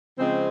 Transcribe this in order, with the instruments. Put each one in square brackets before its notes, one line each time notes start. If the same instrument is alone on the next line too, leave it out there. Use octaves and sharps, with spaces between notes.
[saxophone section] C#3 F3 G#3 C4